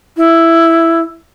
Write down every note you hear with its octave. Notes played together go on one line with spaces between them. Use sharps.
E4